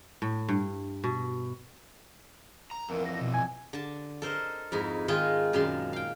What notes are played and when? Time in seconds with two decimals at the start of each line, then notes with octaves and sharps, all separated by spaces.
0.22 A2
0.48 G2
1.04 B2
2.71 A#5
2.89 F2 E3 A#4
3.05 A#6
3.21 B2
3.34 G#5
3.73 D3 A5
4.22 A4 A#4 C5 D#5
4.72 F2 G#2 D#4 E4
5.08 D#3 G#3 D#4 F4 D#5 G#5
5.53 F#2 A#2 D#3 G#3 A5 C6
5.93 F5 G5